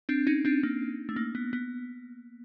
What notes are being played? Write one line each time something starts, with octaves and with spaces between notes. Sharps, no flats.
C4 D4
C#4 D#4
C4 D4
A#3
A3
A#3
B3
B3